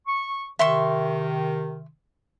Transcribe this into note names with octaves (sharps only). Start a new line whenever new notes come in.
C#6
C3 D#3 E5 C6 C#6